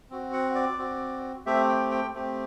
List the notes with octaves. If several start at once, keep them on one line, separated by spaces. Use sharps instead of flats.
C4 F#4
F#5
D5
C4 F#4
A3 C4 G4 E5
G5
G5
A3 C4 G4